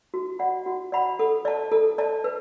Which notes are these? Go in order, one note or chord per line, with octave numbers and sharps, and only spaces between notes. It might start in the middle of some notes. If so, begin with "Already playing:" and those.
F#4
D5 F#5 B5
F#4
D5 F#5 B5
A4
D5 A5
A4
D5 A5
B4